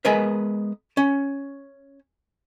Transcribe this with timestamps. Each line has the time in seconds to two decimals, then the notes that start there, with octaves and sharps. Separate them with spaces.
0.05 G#3 B3 A#4 B4 E5
0.97 C#4